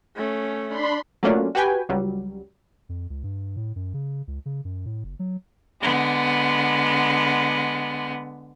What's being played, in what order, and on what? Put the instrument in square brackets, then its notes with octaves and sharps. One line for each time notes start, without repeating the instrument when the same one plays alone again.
[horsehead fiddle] A3 C#4
[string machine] D4 B5 C6
[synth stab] F#3 A3 A#3 C#4 D4 F4
F#4 G4 B4 G5 G#5
C#2 F#3 G3
[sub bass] F2
C#2
G2
A2
F#2
C#3
C#2
C#3
F#2
A2
F#1
F#3
[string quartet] D3 G#3 B3